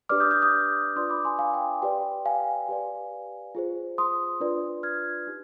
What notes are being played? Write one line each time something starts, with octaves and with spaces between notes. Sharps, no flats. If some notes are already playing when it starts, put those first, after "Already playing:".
D4 G4 B4 D5 D6 F6
D#6 G6
D#6 G6
D#6 G6
D4 F4 B4 D5 C6 D#6
B5 D6
G#5 C6
F5 G#5
G5
G4 B4 D5 G5
F5 G#5
G4 B4 D5
F4 G#4 C5
C6 D#6
D4 F4 B4 D5
F6 G#6
D#4 G4